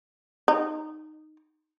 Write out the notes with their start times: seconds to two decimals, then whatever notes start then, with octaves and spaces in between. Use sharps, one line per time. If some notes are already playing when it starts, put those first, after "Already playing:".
0.48 D#4